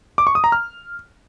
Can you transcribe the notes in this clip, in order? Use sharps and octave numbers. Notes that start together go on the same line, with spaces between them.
D6
C#6
D#6
A#5
F6